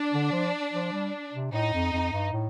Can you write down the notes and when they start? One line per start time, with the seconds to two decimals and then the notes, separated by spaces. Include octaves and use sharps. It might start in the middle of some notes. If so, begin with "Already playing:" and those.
Already playing: D4
0.13 D3
0.32 F3
0.73 F3
0.92 G3
1.33 C3
1.52 A2 D#4
1.73 F2
1.93 F2
2.12 G2
2.33 A2